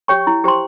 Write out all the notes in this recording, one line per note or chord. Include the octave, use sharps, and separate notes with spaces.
G4 C#5 G5 C#6
E4
G4 C5 G5 C6